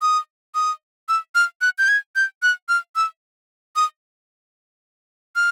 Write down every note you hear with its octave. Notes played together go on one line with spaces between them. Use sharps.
D#6
D#6
E6
F6
F#6
G6
G#6
G6
F#6
F6
E6
D#6
F6